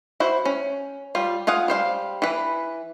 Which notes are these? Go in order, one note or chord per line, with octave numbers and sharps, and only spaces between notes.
E4 F#4 C5
C#4
G3 F4
F4 G#4 F5 F#5
G3 C5 F5
E3 B4